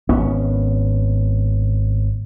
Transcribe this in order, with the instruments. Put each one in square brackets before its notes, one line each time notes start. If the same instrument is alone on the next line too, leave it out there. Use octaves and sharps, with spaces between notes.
[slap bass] G#1 B3 C#4